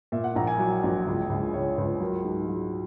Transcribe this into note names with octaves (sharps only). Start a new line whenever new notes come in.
A#2 E5
F#5
A#1 A#5
G#5
F#3
A#1
C#2
C#2
C#2 C#5
C#2 B4
F#3 A#4
G#2
F#3